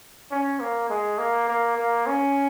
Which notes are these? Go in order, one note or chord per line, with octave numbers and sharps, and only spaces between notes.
C#4
A#3
G#3
A#3
A#3
A#3
C#4